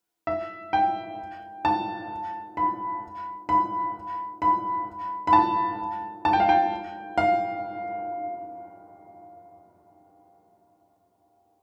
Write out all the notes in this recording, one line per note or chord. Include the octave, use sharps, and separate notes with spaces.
E5
G5
A5
B5
B5
B5
B5
A5
A5
G5
F5
G5
F5